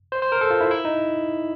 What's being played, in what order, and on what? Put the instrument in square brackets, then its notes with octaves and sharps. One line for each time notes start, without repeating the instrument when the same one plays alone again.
[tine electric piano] C5
C5
A#4
A4
F4
E4
E4
D#4